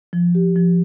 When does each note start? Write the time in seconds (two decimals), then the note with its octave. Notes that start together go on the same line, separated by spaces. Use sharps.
0.13 F3
0.35 G4
0.56 F3